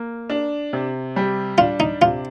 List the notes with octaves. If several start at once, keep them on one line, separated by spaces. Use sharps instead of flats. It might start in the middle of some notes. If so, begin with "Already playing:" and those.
Already playing: A#3
D4
C3
G3
D4 F4
D#4
C3 F4